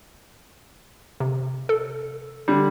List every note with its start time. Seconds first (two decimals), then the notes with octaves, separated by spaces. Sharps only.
1.20 C3
1.69 A4
2.48 D3 G3